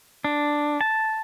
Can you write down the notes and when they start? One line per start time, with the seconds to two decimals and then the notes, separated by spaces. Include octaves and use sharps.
0.24 D4
0.81 A5